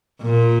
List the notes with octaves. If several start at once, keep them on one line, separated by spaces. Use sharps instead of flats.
A#2